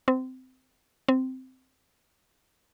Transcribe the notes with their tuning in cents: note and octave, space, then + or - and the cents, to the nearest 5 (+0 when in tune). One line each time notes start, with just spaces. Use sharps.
C4 -20
C4 -10